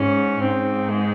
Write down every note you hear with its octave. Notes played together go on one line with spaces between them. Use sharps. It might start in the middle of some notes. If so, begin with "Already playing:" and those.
Already playing: G#2 C#4
G#2 C4
G#3